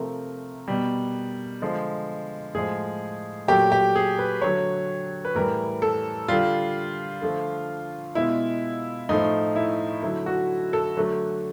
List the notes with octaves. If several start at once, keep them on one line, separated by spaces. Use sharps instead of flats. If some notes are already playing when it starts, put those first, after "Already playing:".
Already playing: C3 F3 A3 A#4
B2 G3
D3 F3 G#3
A2 F3 G#3 G#4
A#2 F#3 A3 G4
G4
G#4
B4
D3 F#3 A3 C#5
B4
A2 E3 G3 A#4
A4
D3 G3 F4
D3 F3 A3
B2 G#3 E4
A2 F3 A3 D#4
E4
D3 F#3 A3 E4
F#4
A4
D3 F#3 A3